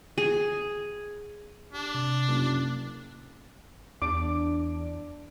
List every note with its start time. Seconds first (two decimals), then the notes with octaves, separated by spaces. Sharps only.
0.18 G#4
1.73 D4 G4
1.94 C3
2.28 F#1
4.02 E2 D4 D6